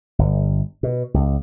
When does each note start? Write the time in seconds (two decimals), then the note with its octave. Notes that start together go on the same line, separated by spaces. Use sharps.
0.19 G1
0.83 B2
1.14 C#2